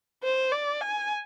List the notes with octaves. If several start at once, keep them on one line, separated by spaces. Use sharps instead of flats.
C5
D5
G#5